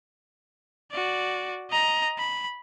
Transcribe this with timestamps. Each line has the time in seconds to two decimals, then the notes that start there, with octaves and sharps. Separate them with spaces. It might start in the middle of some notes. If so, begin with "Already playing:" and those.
0.92 F#4 D5
1.71 D#5 A#5
2.18 B5